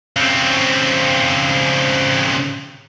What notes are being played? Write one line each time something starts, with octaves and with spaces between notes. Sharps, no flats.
C#3 C4